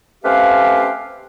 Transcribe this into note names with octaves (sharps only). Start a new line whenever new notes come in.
A3 C4 C#4 G4 B4 F5